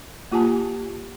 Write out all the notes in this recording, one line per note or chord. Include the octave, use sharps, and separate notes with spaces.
A#3 F4 G4 G#5 A5